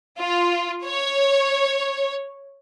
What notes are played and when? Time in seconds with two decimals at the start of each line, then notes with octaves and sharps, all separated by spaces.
0.18 F4
0.84 C#5